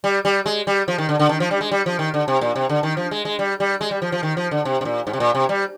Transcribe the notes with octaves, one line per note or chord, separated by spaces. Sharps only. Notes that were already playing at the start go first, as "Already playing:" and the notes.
G3
G3
G#3
G3
F3
D#3
D3
D3
D#3
F3
G3
G#3
G3
F3
D#3
D3
C3
A#2
C3
D3
D#3
F3
G#3
G#3
G3
G3
G#3
G3
F3
F3
D#3
F3
D3
C3
C3
A#2
G#2
C3
A#2
C3
G3